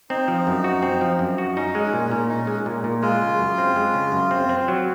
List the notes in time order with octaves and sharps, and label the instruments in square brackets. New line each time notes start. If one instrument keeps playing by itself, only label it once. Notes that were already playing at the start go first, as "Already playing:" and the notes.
[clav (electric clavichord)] C4 [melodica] D#4
[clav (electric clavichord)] F3
F#2
F#4
C4
F3
F#2
F#4
[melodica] C#4 [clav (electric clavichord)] D#4
[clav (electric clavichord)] G#3
A#2
A#2
D#4
G#3
A#2
A#2
[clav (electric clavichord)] G#3 [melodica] F4
[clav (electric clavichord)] C#3
F#2
C4
G#3
C#3
F#2
C4
C4
F#3